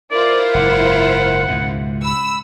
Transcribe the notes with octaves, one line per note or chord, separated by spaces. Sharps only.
E4 F4 A#4 C5 D5
F#1 G#2 F#5
C#2 G#2 B2
B5 E6